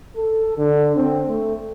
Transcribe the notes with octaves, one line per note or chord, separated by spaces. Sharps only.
A4
D3
C4
A3